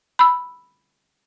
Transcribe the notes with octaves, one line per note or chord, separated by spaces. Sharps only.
B5 E6